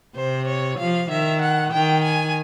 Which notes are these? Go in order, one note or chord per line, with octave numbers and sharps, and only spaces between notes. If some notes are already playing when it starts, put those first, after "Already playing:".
C3 C5
C#5
F3 F5
D#3 E5
F#5
D#3 G5
G#5